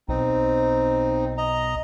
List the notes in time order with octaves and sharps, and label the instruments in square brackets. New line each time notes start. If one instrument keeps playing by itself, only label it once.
[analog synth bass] B1 [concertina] C4 D#4
[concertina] D#5 A#5